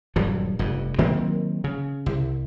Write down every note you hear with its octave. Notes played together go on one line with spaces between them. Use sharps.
D#1 G2 F3 F#3
F1 G2
D#3 F#3 A#3 C4
C#3
C2